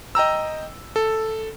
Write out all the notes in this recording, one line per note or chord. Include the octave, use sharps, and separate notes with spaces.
D#5 G5 A#5 E6
A4